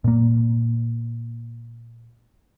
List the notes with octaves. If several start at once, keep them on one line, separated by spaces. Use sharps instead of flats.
A#2 A#3